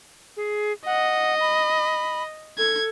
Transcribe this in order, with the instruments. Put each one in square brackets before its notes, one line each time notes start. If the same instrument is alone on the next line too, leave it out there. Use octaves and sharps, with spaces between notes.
[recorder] G#4
[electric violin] D#5 [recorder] F#5
[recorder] B5
[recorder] A4 [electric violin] G#6